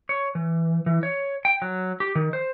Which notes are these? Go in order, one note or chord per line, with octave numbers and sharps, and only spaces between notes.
C#5
E3
E3
C#5
G5
F#3
G4
D#3
C5